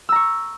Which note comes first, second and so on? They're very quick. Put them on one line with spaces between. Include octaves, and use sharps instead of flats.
E6 A#5 C#6